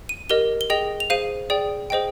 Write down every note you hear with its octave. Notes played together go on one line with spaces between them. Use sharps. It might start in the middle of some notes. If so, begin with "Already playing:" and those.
D#7
G4 A#4 D#5 G7
G7
G#4 D#5 G5 F7
F7
G#4 C5 F5 D#7
G#4 D5 G5
G#4 C5 D#5 G5